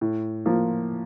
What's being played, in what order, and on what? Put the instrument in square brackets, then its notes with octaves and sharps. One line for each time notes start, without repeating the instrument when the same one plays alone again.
[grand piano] A2
F3 A#3